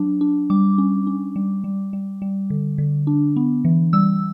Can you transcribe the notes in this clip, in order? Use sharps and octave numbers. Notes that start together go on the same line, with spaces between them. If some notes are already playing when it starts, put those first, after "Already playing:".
Already playing: F#3 D4
D4
G3 D6
C#4
C#4
G3
G3
G3
G3
D3
D3
D4
B3
E3
G3 E6